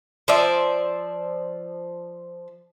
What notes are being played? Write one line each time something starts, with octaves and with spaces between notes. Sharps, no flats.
F3 C5 D5 E5